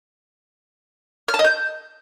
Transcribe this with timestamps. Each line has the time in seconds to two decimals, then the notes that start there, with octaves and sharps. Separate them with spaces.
1.28 F6
1.34 A5
1.39 D#5
1.44 G6